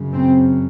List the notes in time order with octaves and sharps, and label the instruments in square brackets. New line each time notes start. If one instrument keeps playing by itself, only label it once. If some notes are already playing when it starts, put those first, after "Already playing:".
Already playing: [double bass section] F#2 C#3
C4